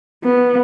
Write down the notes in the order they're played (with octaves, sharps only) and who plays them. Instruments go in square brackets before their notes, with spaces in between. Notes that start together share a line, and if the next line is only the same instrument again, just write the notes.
[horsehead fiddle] B3